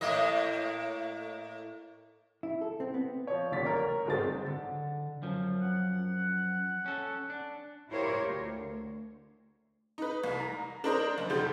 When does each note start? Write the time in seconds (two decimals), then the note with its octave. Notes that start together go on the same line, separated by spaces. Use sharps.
0.01 A2 A#3 D#5
2.43 E4
2.61 A4
2.80 C4
2.94 B3
3.27 F3 C#5
3.52 D#1 A1 A#2 A6 B6
3.65 A#4 C#5
4.06 G1 G#2 G#3 C4 A6
4.46 D3
5.22 F#2 F3
5.60 F#5
6.86 C#4 A4
7.30 D4
7.91 E4 F4 G4 A#4 C5 C#5
8.24 D2
9.98 D#4 B4
10.24 C2
10.40 A#5
10.84 D4 D#4 A#4 C5 D#5
11.18 F#1
11.30 F1 D3 F3 G4 C6 G6